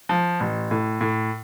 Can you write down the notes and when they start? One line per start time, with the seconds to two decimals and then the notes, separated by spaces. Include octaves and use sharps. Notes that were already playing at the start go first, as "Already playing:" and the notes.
0.09 F3
0.40 A1
0.71 A2
1.01 A2